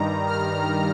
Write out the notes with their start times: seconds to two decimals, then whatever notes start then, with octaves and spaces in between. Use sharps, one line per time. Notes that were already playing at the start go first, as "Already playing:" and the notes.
Already playing: G2 D#3 G3 A#5
0.27 F6